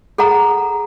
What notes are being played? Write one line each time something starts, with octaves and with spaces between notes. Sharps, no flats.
G#4 A4 F#5 A#5